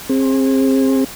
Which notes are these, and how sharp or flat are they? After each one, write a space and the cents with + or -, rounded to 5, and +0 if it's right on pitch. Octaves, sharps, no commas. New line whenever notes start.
C4 +25 G#4 -20